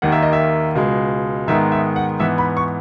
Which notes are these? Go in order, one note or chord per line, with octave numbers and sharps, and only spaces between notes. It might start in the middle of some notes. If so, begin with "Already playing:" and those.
D#2 D#3 A#3 F#5
E5
D#5
E5
C#2 B2 G#3
G#2 D#3 G#3 B3 E5
E5
F#5
G#2 E3 B3 E5
B5
C#6